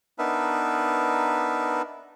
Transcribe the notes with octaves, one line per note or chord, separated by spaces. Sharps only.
B3 D4 D#4 A#4 B4 E5